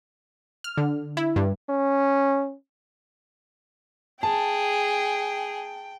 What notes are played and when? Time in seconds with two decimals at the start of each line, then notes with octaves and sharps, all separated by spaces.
0.64 F6
0.77 D3
1.17 E4
1.36 G2
1.69 C#4
4.23 G#4 G5 A5